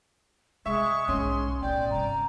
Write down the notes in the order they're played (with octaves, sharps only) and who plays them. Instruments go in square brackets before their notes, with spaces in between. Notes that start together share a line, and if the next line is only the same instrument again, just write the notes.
[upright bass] C3 [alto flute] G#3 [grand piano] E5 [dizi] C#6
[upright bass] B1 G#2 [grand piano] C#4 [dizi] C6
[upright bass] A1 B2 [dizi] D5 [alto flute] G5
[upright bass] G2 C3 [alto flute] A#5